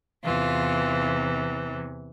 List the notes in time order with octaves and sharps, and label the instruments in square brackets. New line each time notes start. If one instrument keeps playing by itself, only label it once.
[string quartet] E2 C3 E3 F4